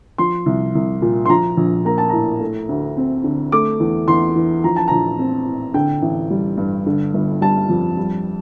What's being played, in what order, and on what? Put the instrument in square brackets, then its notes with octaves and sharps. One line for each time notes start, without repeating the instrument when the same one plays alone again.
[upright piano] F3 C6
C2
C2
A#2
C6
F3 A#5
A#1
A#3 A#5
A5
A2 A#5
A3
D2
C4
D3
A3 D6
E2
E2 C6
E3
F3 A#5
A5
A#1 A#5
C4
A2
D3 G5
A1
G3
G2
D3
G1
G3 A5
F2
G3